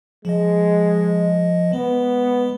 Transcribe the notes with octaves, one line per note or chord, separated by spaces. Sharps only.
F3 G#3 D#5
G#3 B3